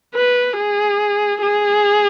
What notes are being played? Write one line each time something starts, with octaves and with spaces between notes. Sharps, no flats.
B4
G#4
G#4